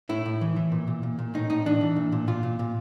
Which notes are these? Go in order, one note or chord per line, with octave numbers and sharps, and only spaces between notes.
A2 E4
A2
E3
E3
A#2
A#2
A#2
A#2
A2 D#4
A2 D#4
E3 D4
E3
A#2
A#2
A#2 F4
A#2
A#2